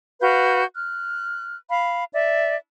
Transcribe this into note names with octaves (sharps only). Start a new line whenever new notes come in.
F#4 B4 F5 G6
F6 F#6
F5 B5
D5 E5